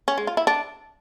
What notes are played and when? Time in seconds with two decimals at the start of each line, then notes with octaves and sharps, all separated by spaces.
0.08 C#4
0.18 G#3
0.27 F4
0.37 E4
0.47 D4